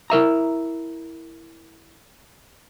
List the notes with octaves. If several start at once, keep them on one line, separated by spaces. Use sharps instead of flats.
E4 A#4 E5 A#5